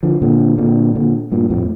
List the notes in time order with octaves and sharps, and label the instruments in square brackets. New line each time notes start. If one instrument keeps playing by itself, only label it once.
[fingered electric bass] D3 F3
A#2 D3
A#2 D3
A#2 D3
G2 A#2
F2 A2